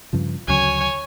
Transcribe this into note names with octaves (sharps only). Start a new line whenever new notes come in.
G2 C#3 F3
D2 C#3 F#3 C#5 G#5